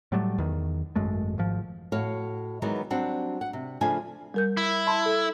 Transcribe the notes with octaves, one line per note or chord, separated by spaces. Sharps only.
A2 F#3 G3 A3
E2 D#3
G#1 F#2 G#3 A3
G#1 G#2 F3
A2 F#4 C#5 F5
D#3 E3 F#3 G#3 B3 D#4
F#3 G3 C4 D4 F#5
F#5
C3
C#3 F3 A3 D4 G#5
G3 A#4 G6
E4
A5 B5 C6
A4